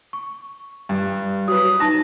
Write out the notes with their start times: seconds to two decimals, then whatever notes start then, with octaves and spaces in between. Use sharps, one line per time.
0.13 C#6
0.89 G2
1.48 F#3 B4 D#6
1.80 D#4 A5 A#6